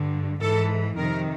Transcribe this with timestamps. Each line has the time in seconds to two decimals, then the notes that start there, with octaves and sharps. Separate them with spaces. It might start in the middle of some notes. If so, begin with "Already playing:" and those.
Already playing: G2 D3
0.40 G#2 E3 A4
0.97 F2 C3 D#3 A#4